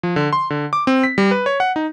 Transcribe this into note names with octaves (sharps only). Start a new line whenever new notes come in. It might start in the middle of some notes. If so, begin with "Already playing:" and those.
F3
D3
C6
D3
D6
C4
B6
G3
B4
C#5
F#5
D#4